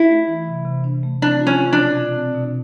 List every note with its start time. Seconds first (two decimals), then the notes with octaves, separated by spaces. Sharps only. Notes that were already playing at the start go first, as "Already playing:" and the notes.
Already playing: E4
0.10 A3
0.27 E3
0.47 C3
0.65 C3
0.84 D4
1.03 A3
1.22 C4 D4
1.40 F4
1.47 C#4
1.59 F4
1.73 D4
1.78 B2
1.97 F4
2.16 C4
2.35 B2